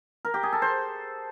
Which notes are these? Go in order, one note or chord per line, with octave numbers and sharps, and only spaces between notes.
A#4
G4
G#4
A4
C5